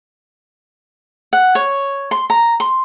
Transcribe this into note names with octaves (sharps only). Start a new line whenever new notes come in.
F#5
C#5
C6
A#5
C6